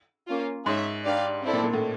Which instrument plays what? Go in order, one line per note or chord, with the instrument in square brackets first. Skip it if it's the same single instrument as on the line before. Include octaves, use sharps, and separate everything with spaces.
[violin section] A#3 C#4 F4
[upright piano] G#2 [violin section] G#4 C#5 E5
[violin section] D4 G4 B4 D5 F5
C4 E4 A4 D5
[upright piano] A#2
A#2
A2